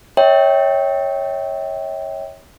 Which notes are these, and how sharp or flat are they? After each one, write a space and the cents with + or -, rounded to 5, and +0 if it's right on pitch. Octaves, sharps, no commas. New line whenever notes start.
C#5 +0 E5 -40 G5 +0